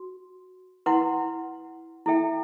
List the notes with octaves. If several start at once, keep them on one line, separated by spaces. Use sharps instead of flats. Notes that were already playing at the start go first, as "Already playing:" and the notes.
Already playing: F#4
E4 B4 F#5 C6
E4 A4 E5 G5